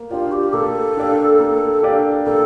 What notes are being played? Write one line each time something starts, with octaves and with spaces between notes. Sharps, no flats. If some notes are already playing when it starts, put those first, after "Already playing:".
Already playing: A#3
D4 F4 G4 D5 F5
G4
A#3 A4
D4 G4 D5 F5
A#3
D4 G4 D5 F5
A#3 A4